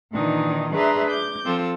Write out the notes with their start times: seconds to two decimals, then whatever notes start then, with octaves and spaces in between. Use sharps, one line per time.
0.13 A#2 D#3 E3 D4 D#4
0.73 D4 G#4 B4 E5 A#5 C6
1.09 D6 G6
1.45 F3 C4 F4 A4